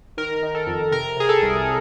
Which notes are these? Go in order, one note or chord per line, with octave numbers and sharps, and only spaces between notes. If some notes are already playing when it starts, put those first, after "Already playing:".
D#3 A#4
D#3
A4
F2
C3 A#4
C3 G#4
A4
C2